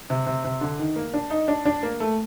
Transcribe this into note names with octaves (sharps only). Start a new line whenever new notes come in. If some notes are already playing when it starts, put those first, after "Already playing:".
C3
C3
C3
D3
D#3
A#3
D4
D#4
D4
D4
A#3
A3